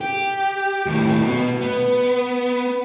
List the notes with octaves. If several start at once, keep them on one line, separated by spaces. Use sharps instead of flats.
G4
D#2 A2
B2
B3